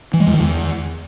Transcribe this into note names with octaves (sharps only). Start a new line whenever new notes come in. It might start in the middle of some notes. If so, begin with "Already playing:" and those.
E3
G#3
E2
D#3
E2